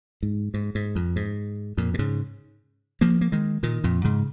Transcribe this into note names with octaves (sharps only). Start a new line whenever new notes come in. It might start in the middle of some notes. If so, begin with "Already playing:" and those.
G#2
G#2
G#2
F2
G#2
F2 A#2
A#2
G#2 C#3
F3 A#3
A#3
D#3 G#3
A#2 D#3
F2 A#2
G#2 C#3